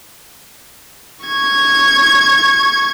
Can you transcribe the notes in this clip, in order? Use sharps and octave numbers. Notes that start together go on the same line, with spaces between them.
C#6 G#6